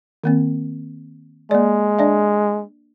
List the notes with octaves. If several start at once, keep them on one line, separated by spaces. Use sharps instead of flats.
D#3 A#3 C4
G#3 A#3 D5
D4 D5 E5